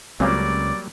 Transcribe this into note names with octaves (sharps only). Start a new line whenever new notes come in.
C#2 F#3 G3 A#3 C4 C#4 F4 D5